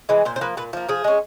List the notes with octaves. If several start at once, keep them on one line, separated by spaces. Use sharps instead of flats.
E3 G#3
A#2 C5
C5
F3 A#3 B4
A#2 B4
F3 A#3
F3 G#4
G#3 C#4